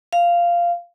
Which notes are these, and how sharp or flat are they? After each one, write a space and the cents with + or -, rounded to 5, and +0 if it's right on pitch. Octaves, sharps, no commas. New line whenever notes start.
F5 -10